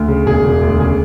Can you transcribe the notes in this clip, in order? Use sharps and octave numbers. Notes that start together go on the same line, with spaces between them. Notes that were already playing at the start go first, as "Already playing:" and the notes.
Already playing: D2
C#3
E1 G#4
E1
D2
C#3 G#4